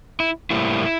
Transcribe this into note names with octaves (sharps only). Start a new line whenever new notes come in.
E4
A2 G3 A#3 E4